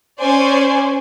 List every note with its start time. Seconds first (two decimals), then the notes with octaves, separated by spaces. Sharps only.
0.19 C#4 C5 D5 G#5